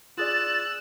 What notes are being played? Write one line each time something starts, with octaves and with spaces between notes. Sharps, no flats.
F4 G#4 D5 E6 F#6 A6